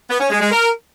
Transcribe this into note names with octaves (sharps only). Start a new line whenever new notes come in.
B3
C#4
G#3
G#3
A#4